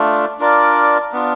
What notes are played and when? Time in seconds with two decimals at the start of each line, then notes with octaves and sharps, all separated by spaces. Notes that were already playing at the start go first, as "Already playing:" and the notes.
Already playing: A3 D4 F4
0.39 D4 F4 A#4 D5
1.12 B3 D4 F4